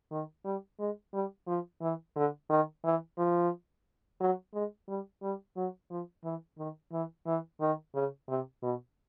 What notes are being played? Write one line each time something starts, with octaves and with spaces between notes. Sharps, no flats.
D#3
G3
G#3
G3
F3
E3
D3
D#3
E3
F3
F#3
G#3
G3
G3
F#3
F3
E3
D#3
E3
E3
D#3
C#3
C3
B2